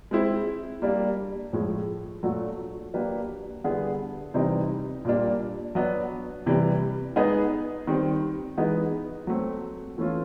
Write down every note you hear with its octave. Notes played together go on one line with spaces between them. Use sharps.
G#3 C4 E4
G3 A#3 D4
A2 F3 G#3
A#2 F#3 A3 D4 F#4
F#3 A#3 D4 G4 B4
D3 G3 B3 E4 G#4
C3 E3 G3 C4 D#4
A#2 G3 A#3 D4
F#3 B3 D4
C3 E3 G3
G#3 B3 D#4 G#4 B4
D#3 G3 C4
E3 G#3 B3 D#4
F#3 A3 C4
E3 A3 C#4 F4